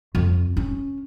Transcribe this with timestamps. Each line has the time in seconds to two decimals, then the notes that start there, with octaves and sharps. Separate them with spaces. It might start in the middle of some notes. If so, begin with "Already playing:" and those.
0.15 F2
0.57 C#4